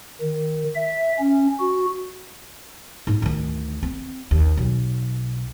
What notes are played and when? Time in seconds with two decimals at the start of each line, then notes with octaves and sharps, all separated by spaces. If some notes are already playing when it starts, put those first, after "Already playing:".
0.21 D#3
0.75 E5
1.19 C#4
1.59 F#4
3.07 G#2 D#4
3.22 D2 D#3
3.83 C4
4.31 D#2
4.57 B1